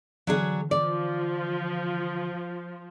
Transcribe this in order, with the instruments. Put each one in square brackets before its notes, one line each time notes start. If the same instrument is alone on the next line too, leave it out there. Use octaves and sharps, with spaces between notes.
[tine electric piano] D3 E3 [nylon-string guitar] F#3 D4 G#4
[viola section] F3 [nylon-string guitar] D5